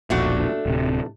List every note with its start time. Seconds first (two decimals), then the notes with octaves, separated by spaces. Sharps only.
0.10 E1 A#1 A#2 A3 D4 F#4
0.66 D1 C3